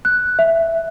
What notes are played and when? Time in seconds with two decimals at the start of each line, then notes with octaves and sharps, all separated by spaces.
0.05 F#6
0.39 E5